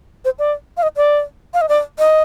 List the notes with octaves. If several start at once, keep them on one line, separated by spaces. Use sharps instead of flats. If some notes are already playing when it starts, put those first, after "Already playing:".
C5
D5
F5
D#5
D5
F5
D#5
D5
D#5